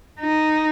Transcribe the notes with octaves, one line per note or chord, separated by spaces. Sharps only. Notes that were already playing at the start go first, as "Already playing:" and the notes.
D#4